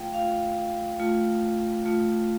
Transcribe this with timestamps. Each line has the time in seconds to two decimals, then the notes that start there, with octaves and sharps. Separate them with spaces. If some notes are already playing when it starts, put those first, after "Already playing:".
Already playing: A3 F4 F5 G5
0.14 A3 F4 F5
1.00 A3 F4
1.86 A3 F4